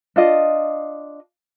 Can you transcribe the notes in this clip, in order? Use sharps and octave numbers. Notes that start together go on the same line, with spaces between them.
D4 F4 D#5